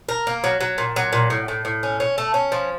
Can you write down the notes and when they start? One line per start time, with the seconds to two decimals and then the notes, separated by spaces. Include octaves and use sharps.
0.09 A#4
0.27 A#3
0.44 F#3
0.61 F#3
0.78 A#2
0.96 F#3
1.13 A#2
1.30 A2
1.48 A2
1.65 A2
1.83 C#4
2.00 C#4
2.18 A3
2.34 C#4
2.52 F3